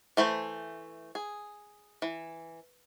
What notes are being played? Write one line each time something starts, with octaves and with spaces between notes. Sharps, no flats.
E3 A3 C5 B5
G#4
E3